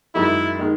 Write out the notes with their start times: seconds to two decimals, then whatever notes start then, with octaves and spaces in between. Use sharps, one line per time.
0.15 F#2 D#3 G#3 E4
0.58 D#3 G#3